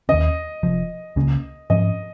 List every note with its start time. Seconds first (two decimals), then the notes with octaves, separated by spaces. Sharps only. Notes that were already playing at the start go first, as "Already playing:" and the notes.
0.09 D#2 D#3 C#4 D#5
0.63 F1 F2 F3
1.16 C#2 C#3 A#3 C#4
1.70 G#2 F3 C#4 D#5